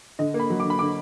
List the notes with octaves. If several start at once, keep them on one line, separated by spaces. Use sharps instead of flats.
D3 D#5
A#3
B5
F#3
D6
D3
B5
D3 D6